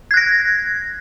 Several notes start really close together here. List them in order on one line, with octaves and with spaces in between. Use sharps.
G#6 F#6 A#6